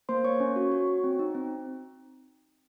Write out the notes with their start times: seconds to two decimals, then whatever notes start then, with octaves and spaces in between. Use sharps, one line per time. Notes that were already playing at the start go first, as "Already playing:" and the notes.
0.09 A#3 C5 C6
0.24 A#3 C#5 C#6
0.40 C#4
0.56 F#4
0.72 F#4
0.88 F#4
1.04 C4
1.19 D#4
1.35 C4